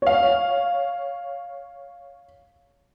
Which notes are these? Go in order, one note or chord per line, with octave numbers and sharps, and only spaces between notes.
C#5 F5